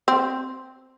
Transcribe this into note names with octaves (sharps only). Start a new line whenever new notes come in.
C4